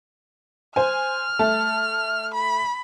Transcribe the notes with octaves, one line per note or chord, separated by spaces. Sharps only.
C5 G#5 F6
A3 A5
B5